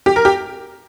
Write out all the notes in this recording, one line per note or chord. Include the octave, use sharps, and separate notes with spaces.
G4
A#4
G4